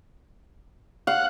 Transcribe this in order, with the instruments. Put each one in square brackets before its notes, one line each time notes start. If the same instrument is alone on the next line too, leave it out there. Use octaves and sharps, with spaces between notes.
[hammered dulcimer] F5 [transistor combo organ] F#5